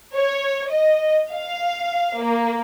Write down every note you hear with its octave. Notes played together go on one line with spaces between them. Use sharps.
C#5
D#5
F5
A#3